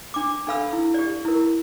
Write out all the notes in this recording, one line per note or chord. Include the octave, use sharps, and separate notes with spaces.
D4 D6
D4 A4 F5 B5 E6
E4
G4 D5
E4 A#4